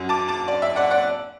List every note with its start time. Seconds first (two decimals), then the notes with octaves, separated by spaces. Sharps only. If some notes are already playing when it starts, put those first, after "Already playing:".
Already playing: F#2 F#3
0.09 A5 D6
0.28 A5 D6
0.48 D5
0.62 E5
0.76 D5 F#5
0.91 D5 F#5